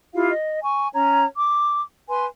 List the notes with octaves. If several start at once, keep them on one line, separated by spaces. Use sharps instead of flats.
E4 F4 G4 F5
D#5
G#5 C#6
C#4 C#5 A#5
D6
B4 G#5 C6